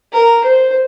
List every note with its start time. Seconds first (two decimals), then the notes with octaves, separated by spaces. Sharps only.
0.13 A#4
0.45 C5